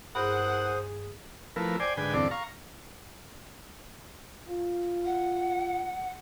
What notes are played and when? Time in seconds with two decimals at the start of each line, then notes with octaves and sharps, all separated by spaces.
0.15 E2 G2 G#4 A#4 C5 F#5 D#6
1.56 F3 A3 E4 A#4 B4
1.80 C5 D5 G5 G#5
1.97 G#2 D3 B4 G5 G#5
2.14 E2 G2 D3 C4 A4 D5
2.31 F5 A#5 C#6
4.48 F4
5.05 F#5